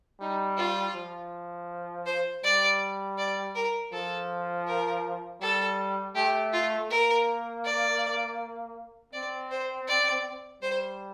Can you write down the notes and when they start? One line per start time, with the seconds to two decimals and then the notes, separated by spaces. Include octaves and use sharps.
0.20 G3 D#4
0.57 F4
0.95 F3
2.06 C5
2.44 G3 D5
3.18 D5
3.55 A#4
3.93 F3 A4
4.67 A#4
5.41 G3 A4
6.15 A3 G4
6.53 F4
6.90 A#3 A#4
7.65 D5
9.13 C4 D5
9.51 C5
9.88 D5
10.62 G3 C5